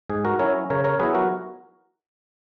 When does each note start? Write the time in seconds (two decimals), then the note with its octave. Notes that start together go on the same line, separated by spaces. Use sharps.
0.10 G#2 G#4
0.25 F#4 A#4
0.39 F#3 C#4 E4 A#4 C#5
0.70 C#3 A#4 C#5
0.84 A#4 C#5
0.99 F#3 B3 E4 G#4 B4
1.14 F#4 A#4